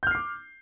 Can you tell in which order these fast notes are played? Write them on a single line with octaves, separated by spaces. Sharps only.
G6 F6 C7 D6